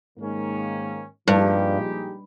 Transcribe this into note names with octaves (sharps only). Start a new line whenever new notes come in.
G#2 D#3 A#3 C#4
G2 A#2 F3 G#3 D#4 G4